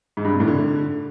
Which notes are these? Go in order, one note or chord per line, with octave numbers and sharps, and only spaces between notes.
G#2
G2
C3
A2
D3